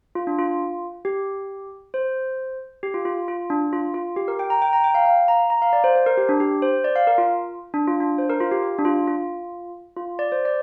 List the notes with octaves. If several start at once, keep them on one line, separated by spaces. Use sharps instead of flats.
F4
D4
F4
G4
C5
G4
F4
F4
F4
D4
F4
F4
G4
A#4
G5
A#5
G5
A#5
G5
F5
F5
A#5
A#5
F5
D5
C5
C5
A#4
G4
D4
G4
C5
D5
F5
A#4
F4
D4
F4
D4
C5
A#4
F4
G4
G4
D4
F4
F4
F4
D5
C5
D5